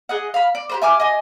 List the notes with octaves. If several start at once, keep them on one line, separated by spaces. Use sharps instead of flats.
G#4 D#5 F#5
F5 B5
D5
G4 B4 C5
E5 G#5 D6 F6
D#5 G#5